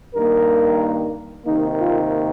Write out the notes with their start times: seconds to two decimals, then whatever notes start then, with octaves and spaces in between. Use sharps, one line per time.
0.15 G2 D#3 A#3 A#4
1.45 C3 D#3 A#3 D#4
1.78 F4